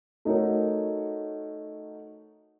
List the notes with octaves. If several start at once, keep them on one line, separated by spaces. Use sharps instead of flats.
A3 D#4 F#4 A#4 C#5